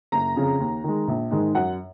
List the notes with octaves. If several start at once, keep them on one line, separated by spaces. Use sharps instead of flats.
F#1 A#5
F2 C#3
D#2
D#3 G#3
A#1
G#2 D#3 G#3 D#4
F#2 F#5